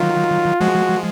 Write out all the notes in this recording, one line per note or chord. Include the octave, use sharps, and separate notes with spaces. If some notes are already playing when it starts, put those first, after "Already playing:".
Already playing: D#3 F#3 F4
F3 G#3 F#4